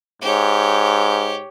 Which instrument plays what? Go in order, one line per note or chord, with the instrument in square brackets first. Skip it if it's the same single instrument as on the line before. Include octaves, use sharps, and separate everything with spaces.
[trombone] G#2 [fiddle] G4 C#5